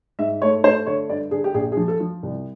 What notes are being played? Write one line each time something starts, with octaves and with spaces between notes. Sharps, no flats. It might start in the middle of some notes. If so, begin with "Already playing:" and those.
G#2 E5
A3 C#5
A3 C5
D3 C#5
G2 D5
D3 G#4
G4
A#1 G#4
G#4
F3
A4
F3
C2